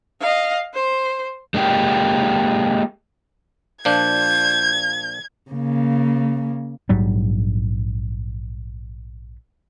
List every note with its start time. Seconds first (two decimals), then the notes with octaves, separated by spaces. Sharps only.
0.20 D#5 F5
0.74 C5
1.54 G#3 A#3 D#4 G4
3.85 A#2 F3 D4 G6 G#6
5.51 C#3 A#3
6.89 A#1 G#2 F#3 G3